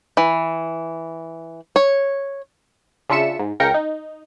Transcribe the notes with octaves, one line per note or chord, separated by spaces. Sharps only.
E3
C#5
C#3 D4 F4 E5 C#7 E7
G#2
C#2 C#3 A#4 G5 A#6 C#7
D#4